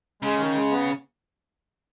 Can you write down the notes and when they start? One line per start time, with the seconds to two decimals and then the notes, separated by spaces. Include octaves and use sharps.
0.22 C#3 G#3
0.39 D#3
0.55 G#3
0.71 B3